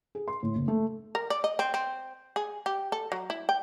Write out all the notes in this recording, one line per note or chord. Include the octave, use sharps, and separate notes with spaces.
G#4
C6
A2
F#1
A3
A#4
D5
D#5
C4
C4
G#4
G4
A4
F#3
E4
G5